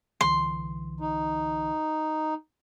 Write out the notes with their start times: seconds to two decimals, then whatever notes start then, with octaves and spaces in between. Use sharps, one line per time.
0.21 C2 D3 E3 C6
1.00 D#4